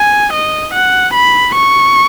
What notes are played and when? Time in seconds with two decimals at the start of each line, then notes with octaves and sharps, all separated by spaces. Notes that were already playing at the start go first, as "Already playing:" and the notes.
Already playing: G#5
0.33 D#5
0.74 F#5
1.14 B5
1.54 C#6